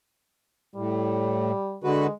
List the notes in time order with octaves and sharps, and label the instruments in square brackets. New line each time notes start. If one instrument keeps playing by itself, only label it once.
[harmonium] A2 [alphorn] G3
[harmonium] D3 F#4 B4 [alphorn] G#3